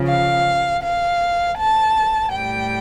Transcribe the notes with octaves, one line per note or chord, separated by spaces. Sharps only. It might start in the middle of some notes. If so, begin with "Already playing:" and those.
Already playing: C#3 F3
F5
F5
A5
A2 G3 G5